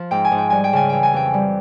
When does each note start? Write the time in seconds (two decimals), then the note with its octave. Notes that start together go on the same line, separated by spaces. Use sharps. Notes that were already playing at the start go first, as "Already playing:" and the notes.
Already playing: F3
0.11 G#2 G5
0.25 G#5
0.32 G#2
0.38 G5
0.50 G3 G#5
0.64 G5
0.73 C#3 G#5
0.89 E3 G5
1.03 G#5
1.14 F2 G5
1.34 G3